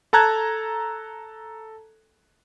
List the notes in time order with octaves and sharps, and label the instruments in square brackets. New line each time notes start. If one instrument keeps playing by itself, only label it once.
[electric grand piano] A4 A5 A#5 F#6 G#6